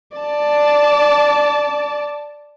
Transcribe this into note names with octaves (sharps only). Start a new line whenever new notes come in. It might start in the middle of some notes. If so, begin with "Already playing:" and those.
D5 A5